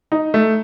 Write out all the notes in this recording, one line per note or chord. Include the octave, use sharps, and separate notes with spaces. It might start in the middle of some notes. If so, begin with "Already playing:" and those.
D#4
A3